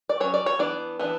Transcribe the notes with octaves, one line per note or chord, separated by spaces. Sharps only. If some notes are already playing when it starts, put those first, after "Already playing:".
D5
F#3 C#4 C#5
D5
C#5
E3 B3 D4 D5
E3 B3 D4